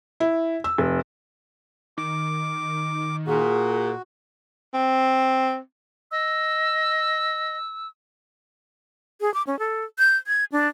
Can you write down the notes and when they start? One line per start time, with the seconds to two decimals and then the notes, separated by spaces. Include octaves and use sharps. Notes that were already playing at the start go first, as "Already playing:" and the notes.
0.20 E4
0.64 E6
0.78 F1
1.98 D#3 D6
3.27 A#2 F#4 G#4
4.74 C4
6.11 D#5 E6
9.21 G#4
9.34 D6
9.47 C#4
9.59 A4
9.99 G6
10.27 G#6
10.52 D4